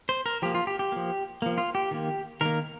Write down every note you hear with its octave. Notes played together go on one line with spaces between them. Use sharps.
C5
A#4
F3 A#3 G4
F4
G4
G4
F3 A#3
F3 A#3
F4
G4
D#3 A#3
D#3 A#3 A#4